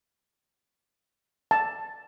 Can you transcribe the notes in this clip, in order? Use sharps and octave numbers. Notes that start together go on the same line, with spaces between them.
A5